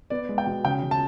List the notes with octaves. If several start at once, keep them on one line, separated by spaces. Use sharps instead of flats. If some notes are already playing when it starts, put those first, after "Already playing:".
B3 D5
G#3
G5
B2
C#3 G5
C#3
A5